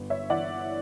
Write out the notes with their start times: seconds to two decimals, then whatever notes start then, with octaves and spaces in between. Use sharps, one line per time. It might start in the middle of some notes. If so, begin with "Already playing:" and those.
Already playing: G1
0.10 C#5 E5
0.29 E3 D5 F#5